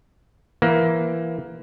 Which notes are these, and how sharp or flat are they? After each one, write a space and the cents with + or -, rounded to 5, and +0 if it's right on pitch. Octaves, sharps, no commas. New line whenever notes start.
E3 +20 A#3 +20